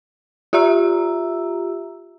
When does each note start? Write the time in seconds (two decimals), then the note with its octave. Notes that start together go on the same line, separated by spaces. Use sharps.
0.53 F4 G4 E5 A#5 E6